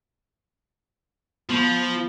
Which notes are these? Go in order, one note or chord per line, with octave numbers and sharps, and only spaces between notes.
F3 B3 C6